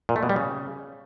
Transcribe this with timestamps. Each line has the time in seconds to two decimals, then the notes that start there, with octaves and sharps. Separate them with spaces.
0.09 A#2
0.16 A3
0.23 B2
0.29 G3
0.36 C#3